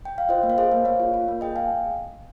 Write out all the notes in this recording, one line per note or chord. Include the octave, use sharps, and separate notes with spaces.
G5
F5
F4 C5 D#5
A#3
F5
G#4 C5 D#5
A#3
A#3 C#5 F5
F4
F4
A#3
G#4 D#5 G5
F5 G#5